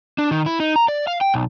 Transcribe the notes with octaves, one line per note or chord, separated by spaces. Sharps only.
D4
D#3
E4
D#4
A#5
D5
F5
G5
B1